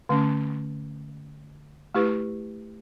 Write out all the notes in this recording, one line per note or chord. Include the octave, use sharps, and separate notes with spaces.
D3 A3 C#4
A3 E4 G4 B4